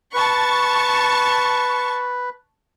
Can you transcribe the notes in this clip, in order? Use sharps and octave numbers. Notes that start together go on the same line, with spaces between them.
B4 A5 C#6